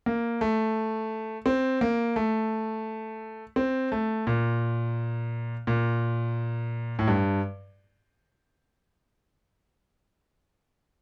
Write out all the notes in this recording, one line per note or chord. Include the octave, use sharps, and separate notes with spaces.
A#3
A3
C4
A#3
A3
C4
A3
A#2
A#2
A2
G2